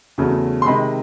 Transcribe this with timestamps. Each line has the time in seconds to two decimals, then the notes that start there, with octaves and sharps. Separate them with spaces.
0.18 E2 C#3 F#3 A3
0.62 C6
0.66 C3 D#3 G#3 B5